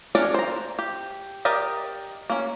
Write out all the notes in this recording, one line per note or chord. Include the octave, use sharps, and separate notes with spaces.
C#4 D4 A#4 C#5 D5
C5 A#5
G4
G4 A#4 D5 D#5
A#3 C#4